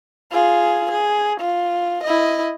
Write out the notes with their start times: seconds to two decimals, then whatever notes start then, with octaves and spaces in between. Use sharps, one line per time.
0.32 F4 G#4
0.91 G#4
1.40 F4
2.04 E4 D#5